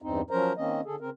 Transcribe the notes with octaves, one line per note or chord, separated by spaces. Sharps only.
E2 G2 C4 D#4
F3 F#3 C#4 A#4 C5 A#5
D#3 A#3 C4 C#4 D#5
D3 G#4 A4
C#3 C4 A#4